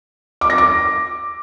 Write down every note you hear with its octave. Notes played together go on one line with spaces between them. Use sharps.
D6
A#6
D6